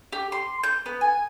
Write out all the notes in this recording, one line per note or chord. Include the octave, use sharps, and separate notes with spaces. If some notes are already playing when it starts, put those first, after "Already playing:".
G4
C6
G6
B3
G#5